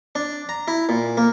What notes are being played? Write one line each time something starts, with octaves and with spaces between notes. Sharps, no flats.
D4
A#5
E4
A#2
A#3